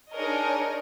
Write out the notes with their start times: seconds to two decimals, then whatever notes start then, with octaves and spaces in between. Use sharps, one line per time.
0.14 D4 D#4 G#4 A#4 C#5 D#5